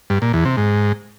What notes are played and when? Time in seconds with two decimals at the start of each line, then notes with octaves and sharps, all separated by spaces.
0.10 G2
0.22 A#2
0.33 E2
0.45 C3
0.57 G#2